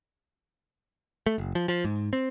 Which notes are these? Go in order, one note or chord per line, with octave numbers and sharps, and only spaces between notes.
A3
F#1
F3
F3
G#2
C4